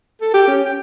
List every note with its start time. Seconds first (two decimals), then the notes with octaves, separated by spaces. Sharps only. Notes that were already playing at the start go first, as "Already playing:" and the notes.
0.21 A4
0.34 G4
0.47 C#4
0.65 G5